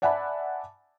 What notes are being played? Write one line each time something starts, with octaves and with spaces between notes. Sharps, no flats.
D5 E5 F#5 G#5 A5 B5